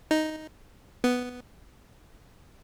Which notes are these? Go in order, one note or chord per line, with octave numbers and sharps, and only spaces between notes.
D#4
B3